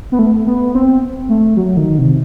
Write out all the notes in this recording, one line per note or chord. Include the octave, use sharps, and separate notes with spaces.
B3
A3
B3
C4
A3
F#3
D#3
C3